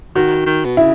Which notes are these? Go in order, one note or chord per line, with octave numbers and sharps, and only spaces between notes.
D#3 F#4
D#3
B2
C#3 E4